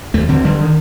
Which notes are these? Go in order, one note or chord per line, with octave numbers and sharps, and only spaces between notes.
D#2 A3
D3 C4
D3 G3
D#3